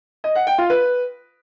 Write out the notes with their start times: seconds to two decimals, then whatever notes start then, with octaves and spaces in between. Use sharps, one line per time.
0.24 D#5
0.35 F#5
0.47 G5
0.58 F4
0.70 B4